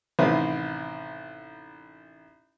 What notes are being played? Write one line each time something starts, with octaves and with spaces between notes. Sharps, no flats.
A1 C3 D#3 B4 C5